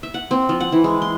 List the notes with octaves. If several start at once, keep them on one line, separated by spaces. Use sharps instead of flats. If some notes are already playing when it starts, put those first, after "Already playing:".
E5
F#5
C4
F3
F#5
E3
G#3
C6